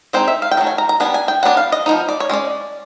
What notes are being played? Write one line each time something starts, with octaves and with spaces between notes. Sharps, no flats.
G#3 C4 D#4 C5
E5
F5
G5
D#3 F#3 A3
G#5
A#5
A#5
G3 B3 D4 G#5
G#5
G5
F#3 B3 D4 F#5
F5
D#5
F3 G#3 B3 D#4
D5
C#5
G#3 C#4 D5